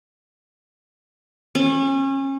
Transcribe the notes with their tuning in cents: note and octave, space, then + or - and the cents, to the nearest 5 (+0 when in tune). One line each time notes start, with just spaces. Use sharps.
C#4 -30